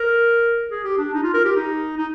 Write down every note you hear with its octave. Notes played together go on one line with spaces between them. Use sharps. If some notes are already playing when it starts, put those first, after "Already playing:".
Already playing: A#4
G#4
G4
D4
D#4
F4
A#4
G4
D#4
D#4